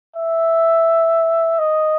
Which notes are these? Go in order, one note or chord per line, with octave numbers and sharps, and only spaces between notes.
E5
D#5